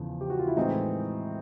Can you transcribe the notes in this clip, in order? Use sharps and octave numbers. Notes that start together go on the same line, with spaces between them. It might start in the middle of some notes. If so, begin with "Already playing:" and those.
Already playing: E2 C#3 F3
G4
F#4
F4
E4
A2 E3 G#3 C4 D#4